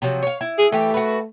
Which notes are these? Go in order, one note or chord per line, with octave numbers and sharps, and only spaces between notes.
C3 F3 F#3
C#5 F5
E4
G#4
E3 A3 G4
F#4 B4